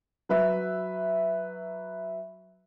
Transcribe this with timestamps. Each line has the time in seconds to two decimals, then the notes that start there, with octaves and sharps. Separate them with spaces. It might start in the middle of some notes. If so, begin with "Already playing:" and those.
0.29 F#3 B4 E5